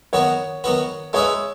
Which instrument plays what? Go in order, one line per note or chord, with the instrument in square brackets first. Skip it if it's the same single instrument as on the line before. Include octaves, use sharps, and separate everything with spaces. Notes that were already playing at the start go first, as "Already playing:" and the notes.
[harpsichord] D#3 F#3 B3 F#4 B4 [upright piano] C#5
[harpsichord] D#3 F#3 B3 F#4 B4
[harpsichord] G#3 D#4 G#4 B4 E5 [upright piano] C#5